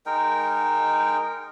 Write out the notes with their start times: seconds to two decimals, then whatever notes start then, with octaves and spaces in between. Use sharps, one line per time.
0.06 G#3 D#4 A#4 G5